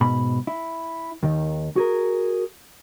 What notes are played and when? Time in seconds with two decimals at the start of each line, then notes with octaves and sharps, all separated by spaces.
0.01 G#2 B2 B5
0.47 E4
1.23 D#2 D#3
1.76 F#4 G#4 A#4